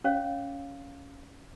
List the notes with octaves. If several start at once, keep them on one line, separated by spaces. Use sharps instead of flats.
C#4 C#5 F5